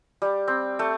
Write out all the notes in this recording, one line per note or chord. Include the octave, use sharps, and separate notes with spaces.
G3
C4
A3